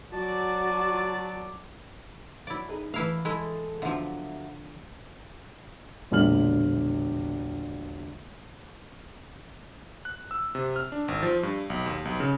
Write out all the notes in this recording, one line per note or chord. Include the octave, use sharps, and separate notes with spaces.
F#3 F#4 D5 A5
F#3 E4 D5 F5
D#4 G#4 B4
E3 A3 E4 F5
G#3 E4 A4
D3 F3 F#3 B3 E5
E1 A#1 D3 F6 F#7
F#6
E6
C3
F6
D4
G#1
F3
G2
B1
D#2
B1
C#3